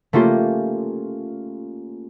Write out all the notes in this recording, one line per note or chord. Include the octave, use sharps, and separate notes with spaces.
A3 A#3 C#4 F4 G4